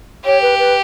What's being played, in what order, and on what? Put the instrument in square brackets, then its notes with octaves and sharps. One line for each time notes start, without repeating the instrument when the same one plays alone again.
[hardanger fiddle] G4 [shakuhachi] C#5
[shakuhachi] B4
B4